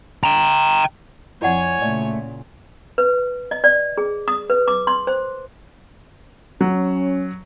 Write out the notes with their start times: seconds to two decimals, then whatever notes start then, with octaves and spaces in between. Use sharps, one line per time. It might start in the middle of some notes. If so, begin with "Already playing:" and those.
0.24 G5 A#5
1.42 F2 E4 C#5 D5 F#5 G#5
1.82 A#2 C#3 A3 D5
2.98 B4
3.51 D#5
3.64 D5
3.98 G#4
4.28 D#6
4.50 B4
4.68 D6
4.87 C6
5.07 C5
6.61 F#3 C#4